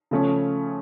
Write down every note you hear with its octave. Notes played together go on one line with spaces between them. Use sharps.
C#3 F3 A3 C#4